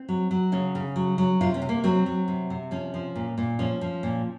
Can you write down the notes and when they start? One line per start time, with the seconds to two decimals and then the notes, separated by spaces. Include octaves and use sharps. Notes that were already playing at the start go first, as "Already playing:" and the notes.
Already playing: C4
0.09 F#3
0.31 F#3
0.52 C#3 C#4
0.75 C#3
0.96 F#3
1.18 F#3
1.41 C3 F4
1.54 C#4
1.62 C3
1.69 A#3
1.84 F#3 C4
2.06 F#3
2.28 C3
2.50 C3
2.71 F3 C#4
2.94 F3
3.16 A#2
3.38 A#2
3.59 F3 C#4
3.81 F3
4.03 A#2